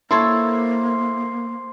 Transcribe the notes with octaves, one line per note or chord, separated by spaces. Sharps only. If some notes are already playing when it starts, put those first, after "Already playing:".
A#3 E4 A4 C5 C#5